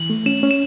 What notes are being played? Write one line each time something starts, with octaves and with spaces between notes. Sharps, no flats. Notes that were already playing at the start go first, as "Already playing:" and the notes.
Already playing: E3 F#7
A3
C#4 E7
C#4
E7